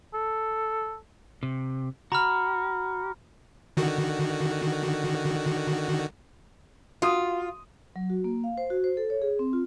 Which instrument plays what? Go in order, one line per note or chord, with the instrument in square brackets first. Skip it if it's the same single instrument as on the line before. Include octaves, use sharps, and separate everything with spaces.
[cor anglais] A4
[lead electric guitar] C3
[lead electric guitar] F#4 [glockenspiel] A#5 B5 F6
[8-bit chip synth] D3 D#3 F#4
[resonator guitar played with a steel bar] F4 [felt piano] F#4 D#6
[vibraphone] F#3
F#4
A#3
F5
C5
F#4
C5
A4
C#5
G#4
C4
F4